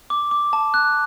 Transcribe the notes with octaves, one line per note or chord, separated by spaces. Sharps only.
D6
D6
A5
F#6